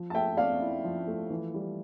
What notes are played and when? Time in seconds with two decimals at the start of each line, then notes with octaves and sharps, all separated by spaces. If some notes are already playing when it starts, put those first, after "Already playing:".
Already playing: F3
0.10 A5
0.14 A3 E5 G5
0.37 C4 D5 F5
0.61 E4
0.84 F3
1.07 A3
1.30 E3
1.54 G3